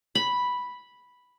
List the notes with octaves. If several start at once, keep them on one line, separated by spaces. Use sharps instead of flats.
B5